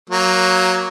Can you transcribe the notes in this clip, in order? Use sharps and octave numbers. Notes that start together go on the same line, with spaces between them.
F#3 A#3